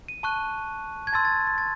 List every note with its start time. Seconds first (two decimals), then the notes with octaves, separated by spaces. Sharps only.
0.08 D#7
0.23 A5 C#6 F#6
1.07 G#6
1.13 A5 C6 E6 A6
1.25 A6
1.47 A6
1.58 A6